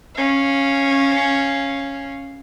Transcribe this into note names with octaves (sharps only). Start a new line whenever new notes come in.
C#4 F5